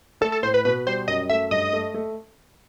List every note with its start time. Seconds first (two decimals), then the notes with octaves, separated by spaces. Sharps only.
0.21 A3 A4
0.32 A4
0.43 A2 C5
0.54 B4
0.65 B2 B4
0.86 G3 C5
1.08 F#2 D#5
1.29 A3 E5
1.51 G2 D#5
1.73 A3
1.94 A3